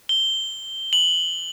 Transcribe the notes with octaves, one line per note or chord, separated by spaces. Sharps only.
G7
F#7